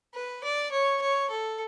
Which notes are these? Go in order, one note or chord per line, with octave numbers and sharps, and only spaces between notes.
B4
D5
C#5
C#5
A4